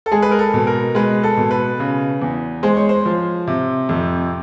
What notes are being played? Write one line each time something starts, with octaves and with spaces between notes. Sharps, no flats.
A4
G#3 G#4
B4
A#4
A4
B2
A#4
G#3 B4
A4
B2
B4
C#3
E2
G#3 C5
C#5
C5
F3
C3
F2